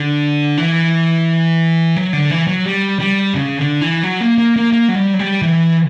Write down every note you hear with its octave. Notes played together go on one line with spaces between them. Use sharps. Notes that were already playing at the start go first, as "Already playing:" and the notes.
Already playing: D3
E3
F#3
D3
E3
F#3
G3
G3
C#3
D3
E3
F#3
A#3
A#3
A#3
A#3
F#3
G3
F#3
G3
E3